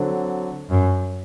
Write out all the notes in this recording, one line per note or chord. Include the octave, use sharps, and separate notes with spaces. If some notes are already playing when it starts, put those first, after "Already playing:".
Already playing: D3 F#3 C4
F#2